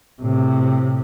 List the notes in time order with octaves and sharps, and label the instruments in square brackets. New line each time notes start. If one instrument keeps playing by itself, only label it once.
[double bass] A2 C3